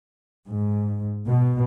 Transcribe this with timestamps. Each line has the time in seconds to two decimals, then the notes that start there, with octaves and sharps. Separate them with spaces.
0.48 G#2
1.27 B2